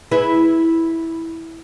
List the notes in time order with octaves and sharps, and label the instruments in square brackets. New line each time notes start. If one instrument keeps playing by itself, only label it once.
[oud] E4 G#4 B4